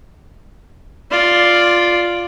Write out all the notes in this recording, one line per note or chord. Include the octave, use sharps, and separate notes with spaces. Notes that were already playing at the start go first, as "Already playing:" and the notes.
F4 D5